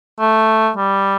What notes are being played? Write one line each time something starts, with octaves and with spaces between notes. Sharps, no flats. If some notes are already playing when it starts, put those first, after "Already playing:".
A3
G3